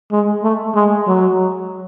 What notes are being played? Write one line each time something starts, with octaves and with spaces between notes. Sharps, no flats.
G#3
A3
G#3
F#3